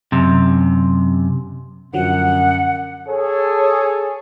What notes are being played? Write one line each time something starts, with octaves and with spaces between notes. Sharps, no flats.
F#2 C3
F#2 D3 F3 F#3 F#5
G#4 A4 C#5